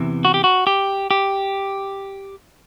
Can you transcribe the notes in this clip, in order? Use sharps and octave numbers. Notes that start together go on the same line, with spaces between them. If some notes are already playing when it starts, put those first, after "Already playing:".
Already playing: E2 C3 E3
F#4
G4
F#4
G4
G4